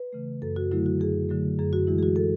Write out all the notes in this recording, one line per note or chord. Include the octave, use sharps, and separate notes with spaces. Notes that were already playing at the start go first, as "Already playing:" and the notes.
Already playing: B4
C#3 E3 A3
F#2 A4
F#4
D3 F#3 A3 E4
F#4
F#2 G#4
D3 F#3 A3
F#2 G#4
F#4
E3 G#3 E4
G#4
F#4
A4